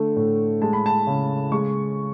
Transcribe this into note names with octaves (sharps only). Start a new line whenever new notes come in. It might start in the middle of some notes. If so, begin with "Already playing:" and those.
Already playing: D3 A3
A2
G#3 A5
B5
A5
C#3
G#3 C#6